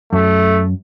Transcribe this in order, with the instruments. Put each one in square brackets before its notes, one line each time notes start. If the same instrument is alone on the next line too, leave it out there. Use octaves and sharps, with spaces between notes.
[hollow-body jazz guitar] F#2 [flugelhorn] A3